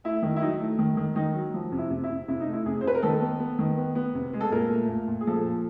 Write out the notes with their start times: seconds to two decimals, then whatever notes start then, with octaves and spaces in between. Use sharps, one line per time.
0.04 A3 E4
0.23 D#3
0.36 E4
0.41 F#3 D#4
0.60 A3
0.79 D#3
0.97 D#3
1.16 D#3 D#4
1.34 F#3
1.54 F3
1.72 C3
1.78 E4
1.90 C3
2.04 E4
2.10 C3
2.28 C3 E4
2.40 D#4
2.47 A3
2.53 E4
2.66 C3 G#4
2.81 C5
2.84 C3 B4
2.95 A#4
3.03 D#3 A4
3.21 B3
3.40 B3
3.59 D#3
3.77 B3
3.95 B3
4.15 C3
4.33 G#3
4.41 A4
4.52 A#2 A#4
4.71 A3
4.89 A#2
5.07 A#2
5.21 G#4
5.27 F3 A4
5.45 A#2